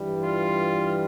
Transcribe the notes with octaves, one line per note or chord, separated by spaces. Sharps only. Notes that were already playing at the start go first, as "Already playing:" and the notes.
Already playing: G2 E3 G3
F4